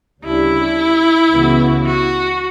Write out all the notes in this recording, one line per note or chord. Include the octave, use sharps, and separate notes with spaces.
D2 C#3 G3 D4 E4
C#2 C#3 E3 B3 F#4
F#4